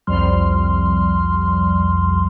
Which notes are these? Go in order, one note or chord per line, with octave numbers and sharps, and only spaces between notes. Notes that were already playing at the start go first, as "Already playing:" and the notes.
C2 F2 F3 G3 C6 F6